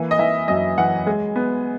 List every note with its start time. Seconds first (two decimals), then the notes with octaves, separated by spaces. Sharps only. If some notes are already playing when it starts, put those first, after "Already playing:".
Already playing: E3 A#3
0.11 D#5
0.19 E3 E5
0.48 F#2 D#5
0.78 E3 F#5
1.06 G#3
1.36 B3